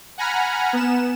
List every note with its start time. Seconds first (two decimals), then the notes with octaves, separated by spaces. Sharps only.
0.18 F#5 G#5 A#5 B5 F6
0.73 B3 E7